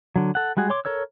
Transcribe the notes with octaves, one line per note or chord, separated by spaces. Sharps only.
D3 F#3
A4 F#5
G3 G#3 F#4 G#4
C#5 C6 D6
A4 A#4 C#5 E6